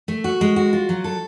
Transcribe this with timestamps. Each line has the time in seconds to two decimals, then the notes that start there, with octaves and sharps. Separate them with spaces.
0.08 A3
0.24 F#4
0.41 G#3
0.56 F#4
0.73 F4
0.89 F#3
1.04 A4